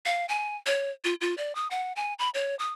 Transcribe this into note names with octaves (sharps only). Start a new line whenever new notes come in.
F5
G#5
C#5
F4
F4
D5
D#6
F#5
G#5
B5
C#5
D#6